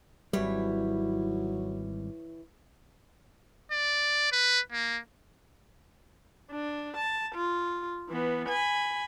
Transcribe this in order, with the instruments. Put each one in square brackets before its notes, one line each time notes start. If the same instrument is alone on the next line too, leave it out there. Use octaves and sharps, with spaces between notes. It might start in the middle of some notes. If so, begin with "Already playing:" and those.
[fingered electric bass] G#1 G3 [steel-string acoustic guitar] E3 E4 C#5 [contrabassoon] F#3
[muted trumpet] D5
B4
A#3
[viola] D4
A5
F4
E3 B3
G#5 B5